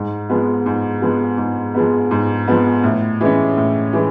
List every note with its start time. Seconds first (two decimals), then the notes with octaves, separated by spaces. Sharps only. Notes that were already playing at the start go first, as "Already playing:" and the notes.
Already playing: G#2
0.29 F3 G#3 B3
0.66 G#2
1.02 F3 G#3 B3
1.38 G#2
1.74 F3 G#3 B3
2.11 G#2
2.48 F3 G#3 B3
2.83 A2
3.21 E3 G#3 C#4
3.57 A2
3.93 E3 G#3